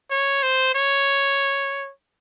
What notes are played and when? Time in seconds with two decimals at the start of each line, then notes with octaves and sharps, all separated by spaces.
0.10 C#5
0.42 C5
0.75 C#5